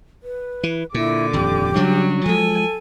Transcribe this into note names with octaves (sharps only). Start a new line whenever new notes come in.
B4
E3
A#2 D3 E4 D6
D#1 F2 G4
C#3 F#3 G3 D4
F3 G#3 A4 G#5